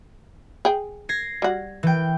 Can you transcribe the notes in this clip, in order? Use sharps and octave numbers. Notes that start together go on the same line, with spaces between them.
G#4 G5
G#6 A#6 C7
G3 F#4
E3 G5